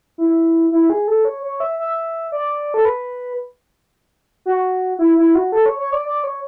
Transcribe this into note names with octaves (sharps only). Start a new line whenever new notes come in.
E4
E4
G#4
A4
C#5
C#5
E5
E5
D5
A4
B4
F#4
E4
E4
F#4
A4
C#5
C#5
D5
D5
C#5